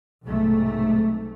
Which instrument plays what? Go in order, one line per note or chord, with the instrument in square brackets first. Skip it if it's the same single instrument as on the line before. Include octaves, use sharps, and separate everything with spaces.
[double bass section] B1 G#2 C3 A3